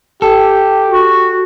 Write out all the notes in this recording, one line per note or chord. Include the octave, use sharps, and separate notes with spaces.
G4 A4
F#4